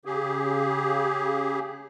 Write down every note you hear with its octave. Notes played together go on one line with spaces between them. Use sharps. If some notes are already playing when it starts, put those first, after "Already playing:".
C#3 G4 G#4